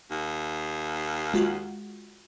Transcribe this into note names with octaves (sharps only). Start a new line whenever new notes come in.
D#2
G#3 F4 F#4